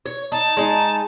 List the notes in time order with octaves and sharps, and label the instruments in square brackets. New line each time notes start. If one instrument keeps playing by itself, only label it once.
[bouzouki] C#5
[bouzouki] D#4 [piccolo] A5
[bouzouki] G#3 D#4